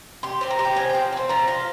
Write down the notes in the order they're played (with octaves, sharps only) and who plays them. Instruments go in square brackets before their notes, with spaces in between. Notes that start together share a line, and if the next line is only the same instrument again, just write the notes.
[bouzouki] G4 [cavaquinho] C6
[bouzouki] C4 [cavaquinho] C6
[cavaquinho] A#5
[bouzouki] G4
[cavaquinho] G5
[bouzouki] F3 [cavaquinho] G#5
[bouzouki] C4 [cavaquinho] G5
[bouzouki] C4 [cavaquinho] C6
[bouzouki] F3 [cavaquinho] A#5
[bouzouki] F4